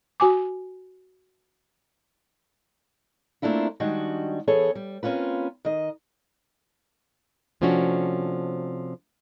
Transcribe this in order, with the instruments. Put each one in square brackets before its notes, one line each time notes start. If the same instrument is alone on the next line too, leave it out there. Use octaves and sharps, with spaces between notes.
[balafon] F#4 G#5 D6
[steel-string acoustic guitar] A3 A#3 C4 D4 E4 F4
D#3 G3 G#3 D4 F#4
E3 B3 G#4 A4 C#5
G3
A#3 C4 C#4 F4 B4
D#3 D#5
[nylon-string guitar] C3 F3 A3 C#4 D4 F#4